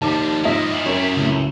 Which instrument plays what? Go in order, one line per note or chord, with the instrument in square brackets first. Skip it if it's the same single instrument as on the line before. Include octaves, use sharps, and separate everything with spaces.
[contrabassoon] D#2 [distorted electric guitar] F3 G3 [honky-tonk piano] A5 D6
[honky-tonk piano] G#2 F3 D#5 [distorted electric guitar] A#3 E4
[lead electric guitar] E5 F#5
[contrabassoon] F#2 [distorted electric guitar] E4 G4 [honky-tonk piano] A#4 C#5
[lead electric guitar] C#2 [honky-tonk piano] A2 A3